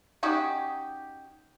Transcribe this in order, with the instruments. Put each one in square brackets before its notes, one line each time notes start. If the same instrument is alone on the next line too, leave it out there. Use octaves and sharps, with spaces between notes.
[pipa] C#4 D#4 F#4 G4